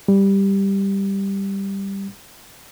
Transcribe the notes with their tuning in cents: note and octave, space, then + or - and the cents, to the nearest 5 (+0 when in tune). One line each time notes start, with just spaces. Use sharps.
G3 +5